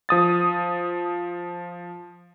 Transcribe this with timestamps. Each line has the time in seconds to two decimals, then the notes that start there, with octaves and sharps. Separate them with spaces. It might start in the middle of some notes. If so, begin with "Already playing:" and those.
0.09 F3 D#6 A6